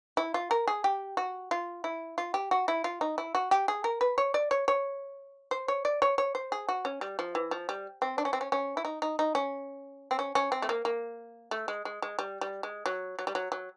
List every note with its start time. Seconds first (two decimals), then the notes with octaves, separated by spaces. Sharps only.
0.17 E4
0.34 F4
0.51 A#4
0.68 G#4
0.84 G4
1.17 F#4
1.51 F4
1.84 E4
2.18 F4
2.34 G4
2.51 F#4
2.68 E4
2.84 F4
3.01 D#4
3.18 E4
3.35 F#4
3.51 G4
3.68 G#4
3.84 A#4
4.01 B4
4.18 C#5
4.34 D5
4.51 C#5
4.68 C#5
5.51 C5
5.68 C#5
5.85 D5
6.02 C#5
6.18 C#5
6.35 C5
6.52 G#4
6.69 F#4
6.85 C#4
7.01 G3
7.19 F3
7.35 E3
7.51 F3
7.69 G3
8.02 C4
8.18 D4
8.25 C#4
8.33 C4
8.41 C#4
8.52 C#4
8.77 E4
8.85 D#4
9.02 D#4
9.19 D#4
9.35 C#4
10.11 C4
10.19 C#4
10.35 C#4
10.52 C4
10.62 A3
10.69 A#3
10.85 A#3
11.51 A3
11.68 G#3
11.85 G#3
12.02 G#3
12.19 G3
12.41 G3
12.63 G#3
12.86 F#3
13.19 F#3
13.27 G3
13.35 F#3
13.52 F#3